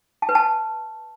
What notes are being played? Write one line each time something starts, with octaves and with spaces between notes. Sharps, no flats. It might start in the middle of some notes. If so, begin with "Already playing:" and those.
A5
B4
A5